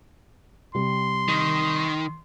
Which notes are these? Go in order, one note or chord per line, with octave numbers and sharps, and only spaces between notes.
C3 G3 G4 C6
D#3